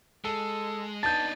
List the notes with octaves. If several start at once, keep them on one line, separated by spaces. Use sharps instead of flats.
G#3 A4 A5
B3 D4 D#4 A5 G6 A6